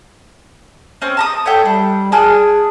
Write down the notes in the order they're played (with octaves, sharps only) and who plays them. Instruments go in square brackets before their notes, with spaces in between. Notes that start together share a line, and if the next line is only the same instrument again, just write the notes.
[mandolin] C4 C#4
A5 A#5 D#6
[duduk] A4 [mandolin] C#5 E5 G5
[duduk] G3 [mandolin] D4
[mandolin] D4 G#5 F6 [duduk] G#4